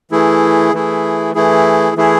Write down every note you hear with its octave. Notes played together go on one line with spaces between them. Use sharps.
E3 A3 E4 G#4
E3 A3 E4 G#4
E3 A3 E4 G#4
E3 A3 E4 G#4